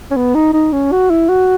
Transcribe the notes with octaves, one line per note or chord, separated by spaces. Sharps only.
C#4
B3
D#4
D#4
C#4
F#4
E4
F#4